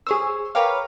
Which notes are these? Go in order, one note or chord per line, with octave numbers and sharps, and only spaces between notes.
G#4 C5 C#5 G#5 E6
A#4 B4 C#5 F5 G5 D6